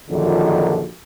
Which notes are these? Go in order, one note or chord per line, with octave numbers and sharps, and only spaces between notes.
A#1 F#2 D3 D#3 F3